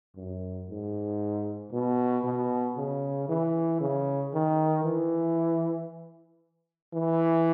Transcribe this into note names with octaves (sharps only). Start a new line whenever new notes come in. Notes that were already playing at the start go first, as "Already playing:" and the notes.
F#2
G#2
B2
B2
C#3
E3
C#3
D#3
E3
E3